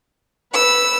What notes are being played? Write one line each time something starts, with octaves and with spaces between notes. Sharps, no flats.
B4 E6